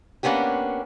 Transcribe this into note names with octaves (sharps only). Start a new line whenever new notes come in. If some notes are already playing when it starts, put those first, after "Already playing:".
A#3 B3 C#4 D4 G4